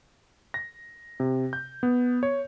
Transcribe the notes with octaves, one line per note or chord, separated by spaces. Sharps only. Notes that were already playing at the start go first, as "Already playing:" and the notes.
A#6
C3
G6
B3
C#5